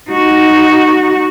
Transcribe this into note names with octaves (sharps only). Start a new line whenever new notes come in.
D#4 F#4